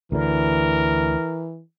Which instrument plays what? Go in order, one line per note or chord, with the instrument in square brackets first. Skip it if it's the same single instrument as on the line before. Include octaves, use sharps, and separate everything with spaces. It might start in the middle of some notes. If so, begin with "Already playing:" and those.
[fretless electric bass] D2 D3 [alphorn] E3 [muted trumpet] A#4